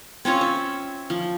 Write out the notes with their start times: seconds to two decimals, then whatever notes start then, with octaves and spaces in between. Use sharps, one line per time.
0.25 C4 C#4 F4 C#5
0.41 E5
1.10 F3